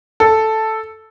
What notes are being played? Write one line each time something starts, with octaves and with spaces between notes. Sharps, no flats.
A4